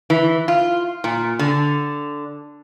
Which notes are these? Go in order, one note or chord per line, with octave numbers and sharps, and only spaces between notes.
E3
F4
A#2
D3